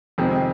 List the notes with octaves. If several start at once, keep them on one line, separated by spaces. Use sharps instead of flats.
F2 C3 D#3 G#3 C4